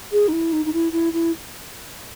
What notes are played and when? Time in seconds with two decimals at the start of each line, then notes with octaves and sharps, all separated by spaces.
0.12 G#4
0.28 D#4
0.32 E4
0.52 D#4
0.65 D#4
0.73 E4
0.92 E4
1.13 E4